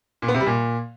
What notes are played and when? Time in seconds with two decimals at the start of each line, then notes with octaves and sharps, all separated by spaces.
0.22 A#2
0.28 B3
0.34 C3
0.40 G3
0.46 A#2